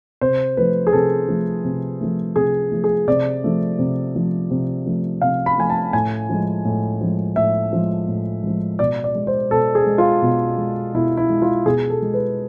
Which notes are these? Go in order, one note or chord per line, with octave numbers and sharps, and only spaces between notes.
C3 C5
F3 A3 B4
G#4
C3 A4
F3 A3
C3
F3 A3
C3 G#4
F3 A3
G#4
C3 D5
F3 A3
C3
F3 A3
C3
F3 A3
C3 F5
B5
F3 A3 G#5
A5
A2 G#5
F3 G#3
A2
F3 G#3
A2 E5
F3 G#3
A2
F3 G#3
B2 D5
D5
G#3
C5
B2 A4
G#4
G#3
F4
B2
G#3
B2 E4
E4
G#3
F4
B2 G#4
A4
G#3
B4